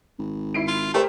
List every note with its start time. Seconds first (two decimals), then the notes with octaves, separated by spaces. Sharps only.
0.19 G#1
0.54 E4 C7 D7
0.67 F4
0.94 A3 G4 A#4 C5